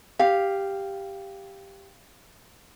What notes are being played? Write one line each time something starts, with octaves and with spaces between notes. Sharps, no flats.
G4 F5